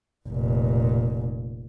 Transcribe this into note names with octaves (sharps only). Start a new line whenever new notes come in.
F1 A#2